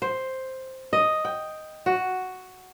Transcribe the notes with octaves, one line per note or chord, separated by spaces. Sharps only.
C5
D#5
G5
F#4